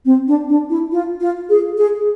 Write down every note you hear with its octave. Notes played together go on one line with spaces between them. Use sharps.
C4
D4
D4
E4
F4
F4
G#4
G#4